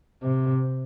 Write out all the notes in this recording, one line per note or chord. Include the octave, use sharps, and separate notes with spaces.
C3